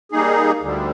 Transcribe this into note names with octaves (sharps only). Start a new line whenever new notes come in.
G3 A#3 D#4 G#4
D2 D3 G3